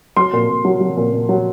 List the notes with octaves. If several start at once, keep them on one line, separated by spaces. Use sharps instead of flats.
F#3 C6
A#2
A#2
F#3
F#3
A#2
A#2
F#3